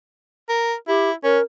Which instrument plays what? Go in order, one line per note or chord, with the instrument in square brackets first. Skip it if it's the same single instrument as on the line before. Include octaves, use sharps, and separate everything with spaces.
[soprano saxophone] A#4
[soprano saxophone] E4 [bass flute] G4
[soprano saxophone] C#4 [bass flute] A#4